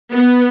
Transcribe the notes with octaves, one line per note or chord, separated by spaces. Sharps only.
B3